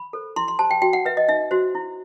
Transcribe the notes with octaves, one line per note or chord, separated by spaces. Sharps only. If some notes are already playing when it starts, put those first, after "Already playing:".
Already playing: B5
A4 C5
E4 C6
C6
G4 C5 A5
G5
F#4 G5
F#5
B4 E5
D#5
D#4 E5
F#4 C5
E4